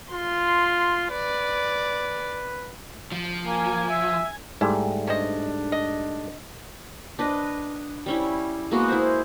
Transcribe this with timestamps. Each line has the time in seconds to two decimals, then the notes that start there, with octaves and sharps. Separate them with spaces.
0.12 F4 C6
1.10 B4 D5
3.12 F3
3.46 A#3 G#5
3.90 E5
4.61 G#2 G3 A3 E4
5.07 C#4 D4 C5 D#5
5.72 D#5
7.19 D4 B4 D#5
8.06 G3 C#4 E4
8.71 G#3 A#3 B3 F#4
8.88 E4 G#4 C5